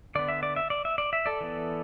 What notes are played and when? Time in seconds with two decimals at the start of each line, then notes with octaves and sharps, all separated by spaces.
0.15 D3 B3 D5
0.28 E5
0.43 D5
0.56 E5
0.70 D5
0.85 E5
0.98 D5
1.13 E5
1.26 A4 D5
1.41 E3 B3